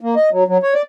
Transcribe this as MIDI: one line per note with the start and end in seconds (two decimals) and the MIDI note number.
0.01 0.15 58
0.16 0.30 75
0.32 0.44 54
0.48 0.58 54
0.63 0.74 73
0.74 0.82 74